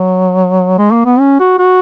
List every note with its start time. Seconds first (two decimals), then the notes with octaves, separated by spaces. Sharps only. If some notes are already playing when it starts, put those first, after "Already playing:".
Already playing: F#3
0.78 G#3
0.92 A#3
1.06 B3
1.19 C#4
1.40 F#4
1.59 F#4